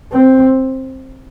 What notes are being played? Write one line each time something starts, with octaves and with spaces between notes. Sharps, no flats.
C4